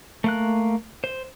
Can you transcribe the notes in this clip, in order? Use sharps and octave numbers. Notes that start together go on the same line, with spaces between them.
A3 A#3 F#6
C5